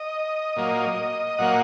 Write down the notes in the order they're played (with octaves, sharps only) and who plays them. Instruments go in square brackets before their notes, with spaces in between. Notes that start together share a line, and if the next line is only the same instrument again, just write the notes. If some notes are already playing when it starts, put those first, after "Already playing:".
Already playing: [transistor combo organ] D#5
A#2 F#3 A#3
A#2 F#3 A#3 F#5